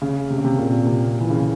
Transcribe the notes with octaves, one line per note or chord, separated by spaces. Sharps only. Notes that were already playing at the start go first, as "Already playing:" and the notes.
C#3
C3
C#3
C3
A#2
C3
E3
C#3